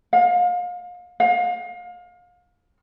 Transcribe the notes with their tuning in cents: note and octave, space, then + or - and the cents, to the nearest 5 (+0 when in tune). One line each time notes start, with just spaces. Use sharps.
F5 +35
F5 +30